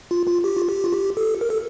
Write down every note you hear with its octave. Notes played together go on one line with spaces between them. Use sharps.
F4
F4
G4
F4
G4
F4
G4
A4
A#4
A4